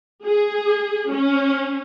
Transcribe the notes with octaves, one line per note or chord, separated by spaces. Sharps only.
G#4
C#4